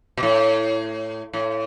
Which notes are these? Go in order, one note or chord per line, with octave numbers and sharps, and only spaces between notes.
B2
A2
A2